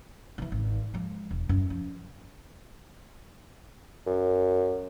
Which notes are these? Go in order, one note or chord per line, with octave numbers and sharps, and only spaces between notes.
D3 E3
G#1
F3 G#3
E1
F#2
F3
F#2